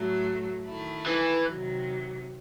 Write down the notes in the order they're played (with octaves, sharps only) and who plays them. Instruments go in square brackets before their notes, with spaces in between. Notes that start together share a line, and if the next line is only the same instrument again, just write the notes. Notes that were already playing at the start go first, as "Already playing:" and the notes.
Already playing: [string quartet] A2 F#3 A3
D#3 A3 E4
[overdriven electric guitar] E3
[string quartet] C3 D#3 F#3